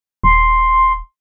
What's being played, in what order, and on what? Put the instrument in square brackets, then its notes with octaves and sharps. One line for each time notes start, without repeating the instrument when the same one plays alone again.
[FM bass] D#1 [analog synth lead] C6